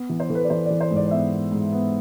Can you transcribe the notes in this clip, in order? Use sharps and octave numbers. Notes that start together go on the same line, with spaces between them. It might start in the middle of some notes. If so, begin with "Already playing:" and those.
Already playing: B3
E3
C5
E3 A4
B4
D5
E3 C5
D5
E3
C5
G#2
D5
D5
B3 E5
B3
G#2
B3